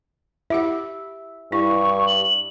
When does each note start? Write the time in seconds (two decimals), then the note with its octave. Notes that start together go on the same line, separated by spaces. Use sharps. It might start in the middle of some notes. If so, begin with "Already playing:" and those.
0.50 E4 G4 E5 F#5
1.52 G2 E4 C#6
2.06 F#7